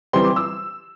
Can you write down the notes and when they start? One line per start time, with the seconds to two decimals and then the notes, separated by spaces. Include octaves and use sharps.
0.13 E3 G3 C4 C6
0.25 D6
0.36 E6